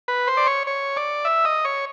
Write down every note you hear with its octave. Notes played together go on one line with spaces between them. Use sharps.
B4
C5
D5
C#5
C#5
D5
E5
D#5
C#5